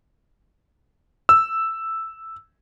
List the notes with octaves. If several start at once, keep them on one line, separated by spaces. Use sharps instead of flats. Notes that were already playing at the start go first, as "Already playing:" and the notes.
E6